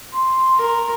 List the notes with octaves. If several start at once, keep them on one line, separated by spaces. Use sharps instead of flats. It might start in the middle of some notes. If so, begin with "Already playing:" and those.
C6
A#4